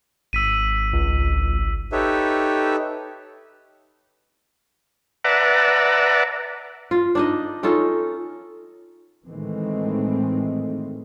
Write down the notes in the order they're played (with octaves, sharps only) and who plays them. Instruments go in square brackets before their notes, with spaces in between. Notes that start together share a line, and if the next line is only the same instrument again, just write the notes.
[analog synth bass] G#1 [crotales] E6 B6 D#7
[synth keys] C#2
[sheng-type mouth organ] D#4 G4 A4 B4 C#5 E5
[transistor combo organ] B4 D5 E5 F#5 A5 A#5
[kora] F4
D4 D#4 D#5
C#4 D#4 F4 A4
[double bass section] A2 D#3 E3 G#3 A3 C4